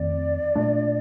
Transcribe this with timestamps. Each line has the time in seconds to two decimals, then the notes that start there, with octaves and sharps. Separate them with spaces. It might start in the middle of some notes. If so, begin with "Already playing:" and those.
Already playing: F2 D#3 A3 C4 D5
0.55 A#2 A3 D4